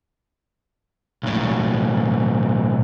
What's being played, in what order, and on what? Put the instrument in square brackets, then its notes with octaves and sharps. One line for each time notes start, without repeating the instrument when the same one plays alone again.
[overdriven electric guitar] B1 A2